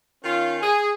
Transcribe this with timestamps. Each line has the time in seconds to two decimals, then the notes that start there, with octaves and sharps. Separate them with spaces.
0.24 D#3 C#4 F4
0.61 G#4